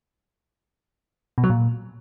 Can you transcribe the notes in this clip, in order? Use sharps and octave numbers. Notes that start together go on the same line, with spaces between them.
B2
F#3
A#2